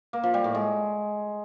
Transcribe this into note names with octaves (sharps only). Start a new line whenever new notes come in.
A#3
F3
G3
A2
G#3